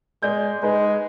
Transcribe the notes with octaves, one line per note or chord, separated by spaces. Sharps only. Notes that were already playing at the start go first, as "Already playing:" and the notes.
G#3 D5 G6
G#3 D#4 B4